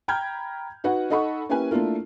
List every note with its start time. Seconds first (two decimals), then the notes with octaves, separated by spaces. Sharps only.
0.08 G5 A#5 B5 F6 G6 G#6
0.84 D#4 F#4 B4 F#5
1.10 D#4 A4 D#5 F#5 B5 C#6
1.49 A#3 C#4 E4 G4 B4 G#5
1.71 A3 A#3 D4 E4 F4 A#4